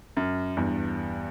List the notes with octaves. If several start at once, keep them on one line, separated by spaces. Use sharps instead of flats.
F#2
E2 G2